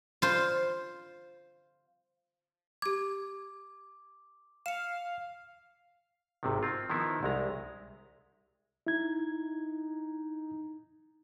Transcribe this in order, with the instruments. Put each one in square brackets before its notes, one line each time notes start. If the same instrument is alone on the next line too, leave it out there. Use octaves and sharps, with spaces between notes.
[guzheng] F4 C5
[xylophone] G4 G#6 [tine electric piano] D6
[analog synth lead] F5 [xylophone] C#7 E7
[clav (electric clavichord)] G#1 C3 D#3
C4 F4
D#3 F3 B3 D#4 E4
C2 G#3 A#5
[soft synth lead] D#4 [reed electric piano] E4 G#6